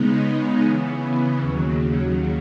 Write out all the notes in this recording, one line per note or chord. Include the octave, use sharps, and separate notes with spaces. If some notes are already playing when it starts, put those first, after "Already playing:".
Already playing: C#3 G#3 B3 D#4
C#3 E3 B3
D#2 C#3 F#3